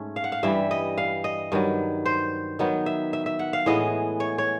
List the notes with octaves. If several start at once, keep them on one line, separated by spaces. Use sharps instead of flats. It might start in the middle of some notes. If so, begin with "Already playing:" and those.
Already playing: G#2 A3 C#4
F5
F#5
F5
G2 E3 G3 E5
D#5
F5
D#5
G2 D#3 F#3
C5
D#3 F#3 B3
E5
E5
E5
F#5
F5
A2 E3 G#3 B3 D#5
C#5
C#5